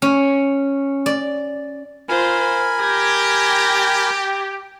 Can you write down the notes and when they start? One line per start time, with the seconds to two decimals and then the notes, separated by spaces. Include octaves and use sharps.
0.02 C#4
1.06 D5
2.09 F4 A#4 C5 G#5 B5
2.80 G4 G#6 A#6